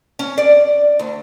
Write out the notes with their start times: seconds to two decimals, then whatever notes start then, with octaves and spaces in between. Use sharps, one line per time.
0.19 C#4
0.38 D5
0.99 D2